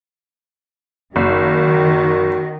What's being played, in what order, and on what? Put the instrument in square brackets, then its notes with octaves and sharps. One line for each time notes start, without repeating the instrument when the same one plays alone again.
[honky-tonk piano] F#1 [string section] D#3 [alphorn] F#4